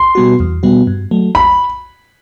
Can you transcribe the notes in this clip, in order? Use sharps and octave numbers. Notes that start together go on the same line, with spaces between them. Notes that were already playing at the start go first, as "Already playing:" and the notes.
Already playing: C6
B2 G3 B3 F#4
E2
B2 G3 B3 F#4
G2
F#3 A3
B5